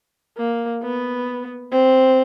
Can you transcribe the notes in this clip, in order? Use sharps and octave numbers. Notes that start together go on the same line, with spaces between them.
A#3
B3
C4